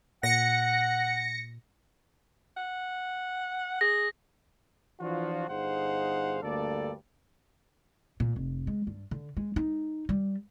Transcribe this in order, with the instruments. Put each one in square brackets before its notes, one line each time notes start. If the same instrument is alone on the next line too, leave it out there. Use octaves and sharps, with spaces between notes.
[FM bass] A#2 [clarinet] F#5 [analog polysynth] A#6 C#7
[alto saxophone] F#5
[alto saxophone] G#4 [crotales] A#6
[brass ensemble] E3 F3 D4 F4 F#4
G1 D#4 G#4 C5 F5 F#5
D2 G2 A#3 A4 D5
[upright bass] A#2
F1
G#3
G2
D3
G#3
D#4
G3